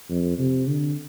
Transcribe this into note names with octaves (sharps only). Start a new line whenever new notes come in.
F2
C3
D3